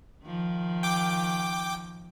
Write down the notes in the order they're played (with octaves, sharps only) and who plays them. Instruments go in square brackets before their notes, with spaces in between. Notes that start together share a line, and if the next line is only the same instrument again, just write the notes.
[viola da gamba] D#3 F3
[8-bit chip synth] G5 D6